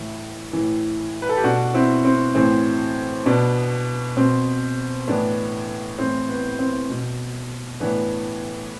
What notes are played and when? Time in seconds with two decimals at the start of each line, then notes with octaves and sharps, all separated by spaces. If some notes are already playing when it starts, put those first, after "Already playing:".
Already playing: A2 E3 E4
0.53 A2 E3
1.22 B4
1.29 A4
1.37 G4
1.44 B2 D4 F#4
1.74 C4 E4
2.05 C4
2.35 A2 E3 C4
3.26 B2 B3 D4
4.17 B2 C4
5.07 A2 E3 B3 D4
5.98 A2 E3 C4
6.29 B3
6.59 C4
6.90 B2
7.80 A2 E3 B3 D4